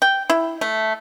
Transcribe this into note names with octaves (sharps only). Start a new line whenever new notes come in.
G5
E4
A3